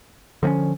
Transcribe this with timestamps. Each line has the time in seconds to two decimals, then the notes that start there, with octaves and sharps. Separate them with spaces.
0.43 D3 F3 A#3 C#4